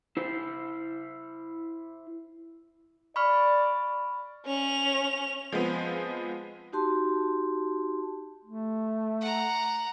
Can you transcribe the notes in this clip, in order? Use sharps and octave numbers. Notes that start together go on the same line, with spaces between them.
E4 C5
D5 B5 C#6 F6
C#4 F7
F3 G#3 B3 C4
D#4 F#4 G4 A5 C6
A3
F#5 A#5